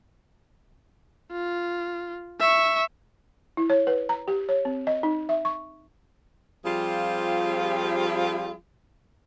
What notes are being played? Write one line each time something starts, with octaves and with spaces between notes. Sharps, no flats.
F4
E5 C#6
E4
C#5
B4
A#5
G4
C#5
C4
D#5
D#4
E5
C#6
F3 G3 C4 F4 G4 G#4